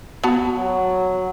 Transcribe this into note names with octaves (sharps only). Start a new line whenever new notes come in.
B3 F#4 A5
F#3